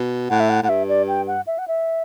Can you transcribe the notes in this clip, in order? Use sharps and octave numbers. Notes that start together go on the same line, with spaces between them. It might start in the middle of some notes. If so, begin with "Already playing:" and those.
Already playing: B2
A2 F#5
E5
F#5
A2 F#5
G2 E5
D5
G5
F#5
E5
F#5
E5